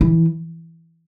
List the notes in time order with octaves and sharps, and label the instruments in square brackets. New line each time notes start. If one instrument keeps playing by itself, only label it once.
[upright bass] E3